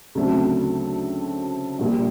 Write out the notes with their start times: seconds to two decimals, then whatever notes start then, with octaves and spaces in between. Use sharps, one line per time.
0.15 D2 C#3 F#3 A3 C4
1.79 A#1 A#2 G3